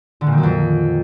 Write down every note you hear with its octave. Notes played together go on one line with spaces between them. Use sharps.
D3
A#2
D#3
F#3
F2